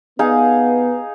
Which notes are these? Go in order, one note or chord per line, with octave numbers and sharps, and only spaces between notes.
B3 D#4 G#4 F5